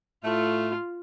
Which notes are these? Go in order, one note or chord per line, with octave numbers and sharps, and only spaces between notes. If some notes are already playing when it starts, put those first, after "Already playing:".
A2 A3 F4